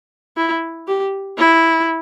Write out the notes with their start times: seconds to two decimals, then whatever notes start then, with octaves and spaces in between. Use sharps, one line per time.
0.37 E4
0.87 G4
1.38 E4